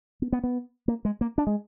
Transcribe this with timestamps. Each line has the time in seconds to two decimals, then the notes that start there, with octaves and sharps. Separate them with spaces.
0.22 B3
0.32 B3
0.44 B3
0.88 A#3
1.05 G#3
1.21 A#3
1.38 D4
1.47 G#3